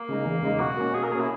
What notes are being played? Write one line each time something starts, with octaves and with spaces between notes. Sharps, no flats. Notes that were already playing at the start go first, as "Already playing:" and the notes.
Already playing: A#3
C#3 G#3 D#4
E2
C#3 G#3 D#4
B2 F#4
A#3 C#4
B2 G#4
A#4
A#3 C#4 G#4
E4